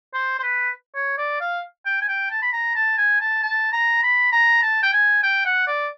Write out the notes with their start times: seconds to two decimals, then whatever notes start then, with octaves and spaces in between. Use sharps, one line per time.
0.14 C5
0.39 C5
0.43 B4
0.95 C#5
1.18 D5
1.41 F5
1.86 G5
2.02 G#5
2.08 G5
2.31 A5
2.42 B5
2.53 A#5
2.75 A5
2.98 G#5
3.21 A5
3.43 A5
3.72 A#5
4.03 B5
4.32 A#5
4.63 A5
4.83 G5
4.93 G#5
5.23 G5
5.45 F#5
5.67 D5